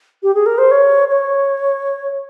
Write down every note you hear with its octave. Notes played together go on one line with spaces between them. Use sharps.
G4
G#4
A#4
C5
C#5
C#5